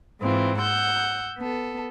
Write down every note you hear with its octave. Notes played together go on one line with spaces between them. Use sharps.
G#2 E3 C4 F4
F#5 E6 G6
B3 A4